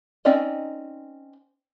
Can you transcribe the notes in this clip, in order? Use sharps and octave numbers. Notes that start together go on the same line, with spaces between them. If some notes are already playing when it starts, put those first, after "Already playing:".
C4 C#4 D#4 D5 D#5